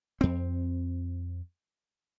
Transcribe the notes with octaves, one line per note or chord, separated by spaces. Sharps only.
F2 C4